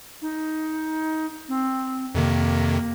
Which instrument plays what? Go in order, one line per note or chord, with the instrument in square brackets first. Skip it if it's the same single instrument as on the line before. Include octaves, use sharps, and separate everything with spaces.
[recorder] D#4
C4
[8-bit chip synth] F2 C3 D#3 [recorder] A#3